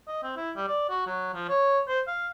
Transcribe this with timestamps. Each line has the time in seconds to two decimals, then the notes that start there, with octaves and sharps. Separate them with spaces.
0.08 D#5
0.23 C4
0.37 E4
0.56 G3
0.68 D5
0.90 F#4
1.07 F#3
1.34 F3
1.49 C#5
1.88 C5
2.07 F5